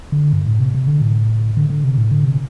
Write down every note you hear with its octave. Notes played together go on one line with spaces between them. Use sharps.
D3
G2
A2
C3
C3
D3
A2
D3
D3
C3
A2
D3
C3